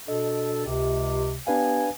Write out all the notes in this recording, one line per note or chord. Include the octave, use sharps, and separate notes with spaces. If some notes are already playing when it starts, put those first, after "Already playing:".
B2 D4 A4 D#5
C#2 C3 G4
B3 D4 G4 B4 F5 G#5